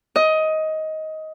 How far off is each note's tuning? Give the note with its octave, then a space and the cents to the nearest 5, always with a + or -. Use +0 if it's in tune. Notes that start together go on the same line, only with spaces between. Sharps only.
D#5 +15